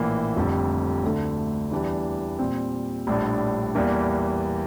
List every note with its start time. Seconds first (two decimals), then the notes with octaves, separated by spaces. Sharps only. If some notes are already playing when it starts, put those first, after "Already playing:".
Already playing: A#1 A2 E3 A#3
0.36 F1 F2 D3 G3
1.03 D2 D3 A3
1.71 E2 E3 G3 D4 G4
2.39 A#2 G3 C4
3.07 A#1 A2 G3 D4
3.75 E2 E3 G3 A#3